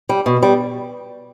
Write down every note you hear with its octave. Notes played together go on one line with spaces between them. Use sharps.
G3
B2
G3